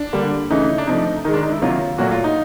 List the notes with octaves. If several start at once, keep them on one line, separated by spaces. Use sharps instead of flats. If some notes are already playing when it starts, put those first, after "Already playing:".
Already playing: D4
D3 G3 A#3
C#3 E3 A3 D#4
D4
C3 F3 A3 D#4
D#3 G#3 D#4
D4
D#4
E4
C3 D#3 F#3 A#3 F4
A#2 F#3 A3 F#4
F4
D#4